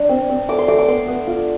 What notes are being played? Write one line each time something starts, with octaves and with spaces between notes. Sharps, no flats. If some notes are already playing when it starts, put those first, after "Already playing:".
Already playing: D4
C4
C4
A3 D6
C6
A3 D6
D6
B3 C6
B3
F4